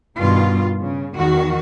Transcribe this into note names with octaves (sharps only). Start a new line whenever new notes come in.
G2 B2 D#3 F4
C#3
E2 D#3 F#4